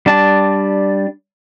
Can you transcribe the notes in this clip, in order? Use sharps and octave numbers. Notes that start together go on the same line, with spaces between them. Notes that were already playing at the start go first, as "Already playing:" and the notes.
G3 D4 A5